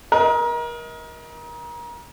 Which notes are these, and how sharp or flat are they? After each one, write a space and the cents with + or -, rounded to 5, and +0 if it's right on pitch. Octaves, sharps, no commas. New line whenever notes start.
A#4 +30 D#5 +30